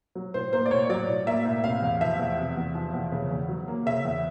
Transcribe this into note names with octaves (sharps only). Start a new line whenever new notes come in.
F#3
A2 C5
A#3 C5
D5
A2 C#5
F#3 D5
A2
A#3 E5
A2
C3 F5
E2
F3 E5
E2
C3
E2
F3
E2
C#3
E2
F#3
A#3
C#3 E5
E2